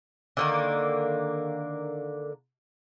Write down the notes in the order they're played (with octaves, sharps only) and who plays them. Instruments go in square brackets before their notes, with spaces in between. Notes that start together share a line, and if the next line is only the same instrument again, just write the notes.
[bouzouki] D3 D#3 A#3